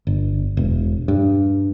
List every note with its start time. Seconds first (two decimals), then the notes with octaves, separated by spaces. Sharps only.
0.07 G1
0.57 E1
1.08 G2